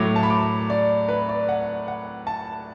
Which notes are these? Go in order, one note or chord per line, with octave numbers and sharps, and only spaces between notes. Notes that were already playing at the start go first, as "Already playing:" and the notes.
Already playing: A2 F#3 D6
A5
B5
D6
D5
B4
D5
F#5
F#5
A5